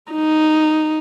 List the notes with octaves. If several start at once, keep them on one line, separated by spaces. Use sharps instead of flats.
D#4